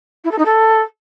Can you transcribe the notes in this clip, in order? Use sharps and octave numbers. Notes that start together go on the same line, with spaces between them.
E4
A4
D#4
A4